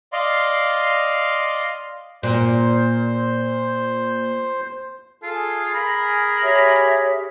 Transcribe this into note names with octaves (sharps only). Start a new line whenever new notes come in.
D5 D#5 F5 C6
A#2 C5
F4 G#4 A4
A#4 B5
G4 C#5 E5